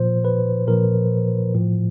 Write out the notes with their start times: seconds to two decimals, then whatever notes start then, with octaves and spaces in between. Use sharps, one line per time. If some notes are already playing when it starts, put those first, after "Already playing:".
Already playing: A#2 F3 C5
0.25 B4
0.68 A#2 F3 A#4
1.55 A2 F3